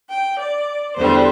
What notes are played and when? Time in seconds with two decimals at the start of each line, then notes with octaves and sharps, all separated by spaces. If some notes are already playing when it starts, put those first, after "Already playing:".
0.10 G5
0.38 D5
0.95 E2 D3 G3 C5